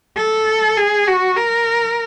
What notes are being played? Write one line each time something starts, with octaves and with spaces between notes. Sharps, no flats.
A4
G#4
F#4
A#4